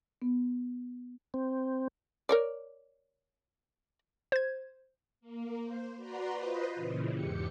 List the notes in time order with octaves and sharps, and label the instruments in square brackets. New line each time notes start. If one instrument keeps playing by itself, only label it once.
[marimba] B3
[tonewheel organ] C4
[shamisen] A#4 C#5 D5
[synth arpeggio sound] C5 G#6
[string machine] A#3
C5
F#4 B4 D5 A#5 C6
F4 B4 C5 D#5
A#2 C#3 E3
E2 G#2 G4 C#7